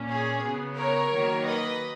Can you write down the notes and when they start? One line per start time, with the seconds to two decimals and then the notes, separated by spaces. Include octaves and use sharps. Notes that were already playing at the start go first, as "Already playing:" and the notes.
Already playing: A#2 A#3 C#4
0.09 G#4
0.43 C#3 F#3 B3
0.77 A#4 C#5
1.12 D#3 F#3 A#3
1.46 B4 D#5